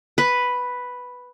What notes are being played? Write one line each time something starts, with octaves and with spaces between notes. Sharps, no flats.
B4